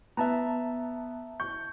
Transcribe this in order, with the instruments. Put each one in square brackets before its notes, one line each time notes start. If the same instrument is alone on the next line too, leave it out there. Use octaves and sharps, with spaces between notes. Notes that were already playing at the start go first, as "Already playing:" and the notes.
[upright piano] B3 [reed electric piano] E5 A5 A#5
[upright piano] C#6 [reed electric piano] G6